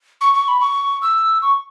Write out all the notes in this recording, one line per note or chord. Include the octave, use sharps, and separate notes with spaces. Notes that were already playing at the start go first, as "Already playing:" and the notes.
C#6
C#6
B5
C#6
E6
C#6